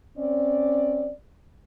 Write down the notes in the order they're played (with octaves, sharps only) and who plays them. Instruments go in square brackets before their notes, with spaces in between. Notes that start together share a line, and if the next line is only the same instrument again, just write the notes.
[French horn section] C4 C#4 D5